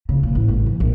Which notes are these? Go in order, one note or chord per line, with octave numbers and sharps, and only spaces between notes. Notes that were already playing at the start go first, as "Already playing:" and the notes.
C#3
A#2
A1
G#1
F3
A#1